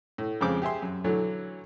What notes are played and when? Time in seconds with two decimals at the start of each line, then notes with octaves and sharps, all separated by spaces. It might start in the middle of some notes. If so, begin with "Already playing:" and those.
0.18 A2
0.41 F2 C#3 G#3 C5 D6
0.62 G4 G#4 E5 C6
0.82 F#2
1.04 D3 E3 F#3 A3